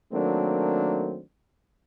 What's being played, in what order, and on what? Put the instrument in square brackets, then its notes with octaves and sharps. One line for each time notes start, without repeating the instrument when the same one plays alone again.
[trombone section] D#3 F#3 A3 A#3 C4 D4